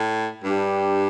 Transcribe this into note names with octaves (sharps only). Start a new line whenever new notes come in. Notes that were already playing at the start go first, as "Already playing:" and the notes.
Already playing: A2
G2 G3 D4 G4